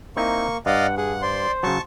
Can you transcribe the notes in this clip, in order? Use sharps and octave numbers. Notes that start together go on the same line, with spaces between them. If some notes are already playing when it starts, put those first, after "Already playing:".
A#3 C4 D#4 E4 C#6
G2 D5 D#5 F5 F#5
G#4 F#5
C5 D5 C6
C#3 F#3 A5 C#6